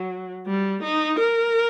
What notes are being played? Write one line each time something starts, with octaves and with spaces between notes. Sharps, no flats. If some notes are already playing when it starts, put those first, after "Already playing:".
Already playing: F#3
G3
D#4
A#4